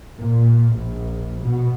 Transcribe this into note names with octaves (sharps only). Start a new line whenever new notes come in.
A#2
A#1
B2